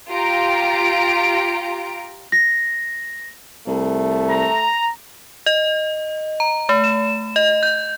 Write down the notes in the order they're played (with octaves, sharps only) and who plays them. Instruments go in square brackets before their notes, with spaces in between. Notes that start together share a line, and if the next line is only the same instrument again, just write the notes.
[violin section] F4 G4 A#5 D7
[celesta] A#6
[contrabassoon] C2 [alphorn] A3
[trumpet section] A#5
[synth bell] D#5
A#5
A3
E7
D#5
G6